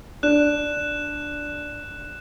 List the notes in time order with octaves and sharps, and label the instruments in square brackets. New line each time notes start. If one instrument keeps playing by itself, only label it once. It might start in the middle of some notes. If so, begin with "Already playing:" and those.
[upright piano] D4 [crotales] F#6 E7